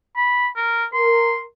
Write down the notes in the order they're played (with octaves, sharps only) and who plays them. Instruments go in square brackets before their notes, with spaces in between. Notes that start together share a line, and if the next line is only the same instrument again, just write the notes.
[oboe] B5
A#4
[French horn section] A#4 [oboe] C6